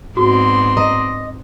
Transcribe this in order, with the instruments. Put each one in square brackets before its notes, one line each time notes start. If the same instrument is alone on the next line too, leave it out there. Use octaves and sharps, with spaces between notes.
[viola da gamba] G#2 C4 D4 [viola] B3 C6 [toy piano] F#4
[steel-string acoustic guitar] D#5 [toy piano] A#5